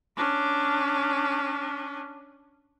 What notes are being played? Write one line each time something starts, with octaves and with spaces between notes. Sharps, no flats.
C#4 D4